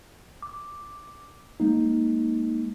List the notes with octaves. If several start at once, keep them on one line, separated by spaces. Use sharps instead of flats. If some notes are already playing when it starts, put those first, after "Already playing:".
D6
G#3 A#3 D#4